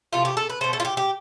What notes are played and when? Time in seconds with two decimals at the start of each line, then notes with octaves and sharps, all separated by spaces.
0.13 C3 F3 A3 F4
0.25 G4
0.37 A4
0.50 B4
0.61 B2 A3 C5
0.73 A4
0.80 F4
0.85 G4
0.97 G4